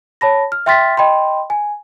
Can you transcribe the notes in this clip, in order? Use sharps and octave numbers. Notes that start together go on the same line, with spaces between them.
C#5 A5 B5 A#6
F6
E5 G5 C6 F6 A6 B6
D#5 G5 B5 C6
G#5